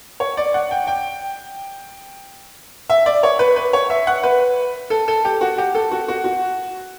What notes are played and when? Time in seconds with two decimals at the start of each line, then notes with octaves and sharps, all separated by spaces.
0.20 C#5
0.37 D5
0.54 F#5
0.71 G5
0.87 G5
2.90 E5
3.06 D5
3.23 C#5
3.39 B4
3.56 B4
3.73 C#5
3.90 E5
4.07 F#5
4.23 B4
4.90 A4
5.08 A4
5.25 G4
5.41 F#4
5.58 G4
5.75 A4
5.91 F#4
6.08 F#4
6.24 F#4